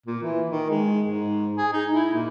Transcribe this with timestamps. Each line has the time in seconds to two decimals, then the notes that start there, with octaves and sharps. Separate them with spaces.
0.06 A#2
0.23 E3
0.50 D#3
0.70 G#3
1.06 G#2
1.58 G#4
1.73 D#4
1.93 E4
2.14 A#2